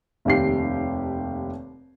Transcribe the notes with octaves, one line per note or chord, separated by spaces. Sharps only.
F1 D#2 G4 C7